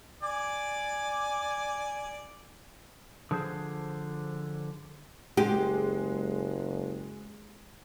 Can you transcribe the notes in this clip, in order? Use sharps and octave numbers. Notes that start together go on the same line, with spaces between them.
D5 G#5 D6
D3 F3 G#4 C5
F#1 G#3 G4